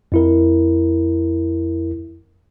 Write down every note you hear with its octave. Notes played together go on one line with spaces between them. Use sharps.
F2 E4 A#4